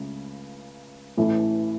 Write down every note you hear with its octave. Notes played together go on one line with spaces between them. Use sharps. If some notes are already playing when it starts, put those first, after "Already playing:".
Already playing: C#2 C#3 A3
A1 A2 E3 A3